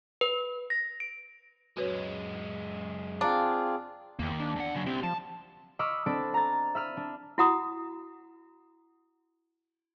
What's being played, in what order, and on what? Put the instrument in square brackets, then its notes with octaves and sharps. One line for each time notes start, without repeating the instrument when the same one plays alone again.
[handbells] B4
A#6
D7
[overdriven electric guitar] F#2 G#3 [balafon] F#4 B4 C#5
[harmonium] C4 F4 G#4 [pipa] D4 [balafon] F5 A#5
[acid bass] E2 [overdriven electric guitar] D#3 A#3
[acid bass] D4
[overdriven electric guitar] E2 F#5
C#3 F#3
[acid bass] C4 [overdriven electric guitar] E4 G4
[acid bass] F3 [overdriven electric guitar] A5
[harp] D#5 B5 C#6 D6 E6 F6
C4 D4 A4 B5 A6 D7
A#5 A6
E5 B5 F6 D#7
D4
[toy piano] E4 F#4 F#5 A#5 D#6